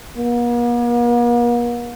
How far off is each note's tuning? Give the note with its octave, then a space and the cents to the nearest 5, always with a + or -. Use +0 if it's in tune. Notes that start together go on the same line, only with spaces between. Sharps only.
A#3 +45